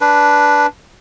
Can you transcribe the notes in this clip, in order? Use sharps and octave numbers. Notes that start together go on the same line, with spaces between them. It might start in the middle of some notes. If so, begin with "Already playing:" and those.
D4 B4